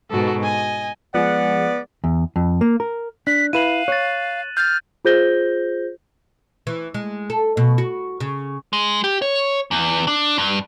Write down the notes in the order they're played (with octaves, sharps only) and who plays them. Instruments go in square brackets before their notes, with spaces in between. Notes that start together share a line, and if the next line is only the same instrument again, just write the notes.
[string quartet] G#2 B2 B3 [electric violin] F#4 A4
[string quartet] D#5 [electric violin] G#5
[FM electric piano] F3 G#3 G#4 [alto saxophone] B3 [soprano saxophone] D5 [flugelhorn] F#5
[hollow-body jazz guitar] E2
F2
A#3
A#4
[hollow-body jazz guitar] D4 [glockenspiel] F#6 [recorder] B6
[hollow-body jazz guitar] E4 B4 [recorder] F5 [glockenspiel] D#7 E7 F#7
[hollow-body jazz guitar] C#5 [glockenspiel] F#6 A6
[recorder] F6 [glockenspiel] G6 A6
[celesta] F4 G#4 C5 G6 A#6 G7
[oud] E3
G#3
A4
B2
F#4
C#3
[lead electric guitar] G#3
G4
C#5
E2
D4
G2